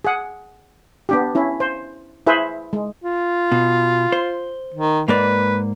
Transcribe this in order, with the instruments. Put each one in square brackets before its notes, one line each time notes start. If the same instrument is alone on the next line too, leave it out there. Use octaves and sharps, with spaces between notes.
[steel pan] G#4 F#5
B3 D4 G4
C#4 E4
C5
E4 G#4 B4 C5 E5
G#3
[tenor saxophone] F4
[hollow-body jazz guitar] B2
C5
[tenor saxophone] D#3
[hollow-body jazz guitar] G#2 A#3 D5 [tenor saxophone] B4